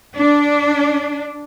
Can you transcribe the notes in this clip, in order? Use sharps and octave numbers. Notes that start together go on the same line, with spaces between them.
D4